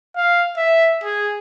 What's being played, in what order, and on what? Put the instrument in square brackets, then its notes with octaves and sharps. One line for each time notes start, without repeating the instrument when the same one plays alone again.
[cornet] F5
E5
G#4